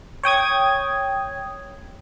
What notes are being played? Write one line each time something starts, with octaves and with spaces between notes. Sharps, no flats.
C#5 G5 D#6 G#6